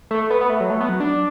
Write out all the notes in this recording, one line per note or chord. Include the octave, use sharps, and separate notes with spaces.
A3
B3
B3
A3
F#3
A3
B3
F#3
D4